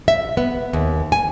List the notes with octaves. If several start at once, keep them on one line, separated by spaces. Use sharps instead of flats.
E5
B3
D#2
G#5